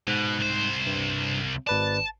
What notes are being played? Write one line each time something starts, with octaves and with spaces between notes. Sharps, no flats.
G#2 B2 F#6
C2 C5
G2
G#1 B4 D5 A5